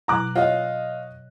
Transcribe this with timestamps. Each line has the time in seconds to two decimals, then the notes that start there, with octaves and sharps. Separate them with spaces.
0.08 B2 F#3 A#5 D6 F#6 A#6
0.35 F4 C#5 D#5 F5